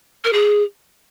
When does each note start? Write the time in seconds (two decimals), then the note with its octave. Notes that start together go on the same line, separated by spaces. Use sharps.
0.24 A#4
0.33 G#4